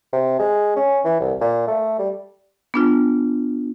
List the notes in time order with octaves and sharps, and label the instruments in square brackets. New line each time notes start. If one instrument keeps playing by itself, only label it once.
[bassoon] C3
G#3
C#4
E3
C2
A#2
A3
G3
[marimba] B3 D4 F4